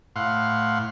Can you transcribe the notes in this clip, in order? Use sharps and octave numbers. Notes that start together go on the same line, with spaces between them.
A2 F5 F#5 C6